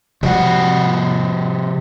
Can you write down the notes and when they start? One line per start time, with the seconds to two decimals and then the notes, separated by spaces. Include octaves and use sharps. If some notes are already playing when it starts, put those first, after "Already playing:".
0.23 C3 F3 G3 G#3 F#4 F#5